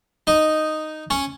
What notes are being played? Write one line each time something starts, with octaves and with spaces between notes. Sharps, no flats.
D#4 D#5
C#4 C#5